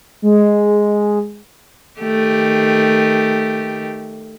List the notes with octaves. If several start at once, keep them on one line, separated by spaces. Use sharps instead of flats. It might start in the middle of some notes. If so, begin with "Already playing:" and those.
G#3
D#3 A3 G4